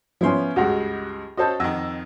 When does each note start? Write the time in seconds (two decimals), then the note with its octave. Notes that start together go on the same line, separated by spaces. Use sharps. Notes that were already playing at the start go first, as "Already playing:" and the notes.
0.21 F3 B3 C#4 E4 C6
0.56 C#2 G2 G#3 F#4 F#5
1.37 C#4 F#4 A4 C5 D#5 A5
1.60 F2 D#3 F#5 E6 A#6